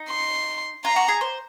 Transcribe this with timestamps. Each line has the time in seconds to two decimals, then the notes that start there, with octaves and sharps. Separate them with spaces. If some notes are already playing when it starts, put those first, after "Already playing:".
Already playing: D#4
0.09 C6
0.84 F4 A#5
0.96 F#4
1.08 G#4
1.21 C5